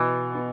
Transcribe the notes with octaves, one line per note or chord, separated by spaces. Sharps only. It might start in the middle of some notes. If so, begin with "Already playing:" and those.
Already playing: B2 E3
B3